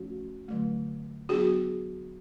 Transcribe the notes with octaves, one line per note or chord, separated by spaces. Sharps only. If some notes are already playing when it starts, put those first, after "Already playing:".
Already playing: F3 A3 C#4 F#4
D3 F#3 A3
F#3 B3 D4 F#4 G#4